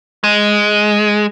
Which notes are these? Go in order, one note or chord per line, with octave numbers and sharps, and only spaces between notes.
G#3